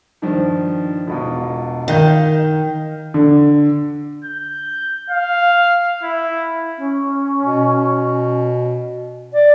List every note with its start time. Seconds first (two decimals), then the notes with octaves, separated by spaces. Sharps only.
0.22 G2 D#3 F3
1.07 E1 B2 F4
1.88 D#3 D#5 F5 G6
3.14 D3
4.25 G6
5.10 F5
6.03 E4
6.78 C#4
7.43 B2
9.33 D5